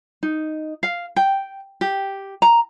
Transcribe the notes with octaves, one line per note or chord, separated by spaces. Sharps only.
D#4
F5
G5
G4
A#5